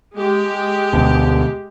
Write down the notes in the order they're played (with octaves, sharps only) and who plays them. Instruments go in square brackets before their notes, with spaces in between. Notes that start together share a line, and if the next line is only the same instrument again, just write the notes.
[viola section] G#3 G4
[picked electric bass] D2 B2